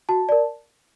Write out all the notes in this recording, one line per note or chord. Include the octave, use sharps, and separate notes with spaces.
F#4 A5
A#4 D5